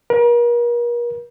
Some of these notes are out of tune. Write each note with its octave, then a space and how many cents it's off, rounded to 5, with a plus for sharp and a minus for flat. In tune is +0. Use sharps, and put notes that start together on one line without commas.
A#4 +40